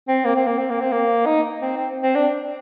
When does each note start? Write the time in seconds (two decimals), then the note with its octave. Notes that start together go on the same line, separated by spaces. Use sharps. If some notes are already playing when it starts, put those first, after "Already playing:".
0.08 C4
0.25 A#3
0.36 C4
0.47 A#3
0.58 C4
0.70 A#3
0.81 C4
0.92 A#3
1.26 D#4
1.61 C4
1.77 C4
2.03 C4
2.15 D4